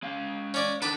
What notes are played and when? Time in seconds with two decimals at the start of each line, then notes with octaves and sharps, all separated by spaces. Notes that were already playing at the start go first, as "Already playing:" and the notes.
0.03 G#3 F5
0.54 C#4 D5
0.82 D3 D#3 B4 A5 D6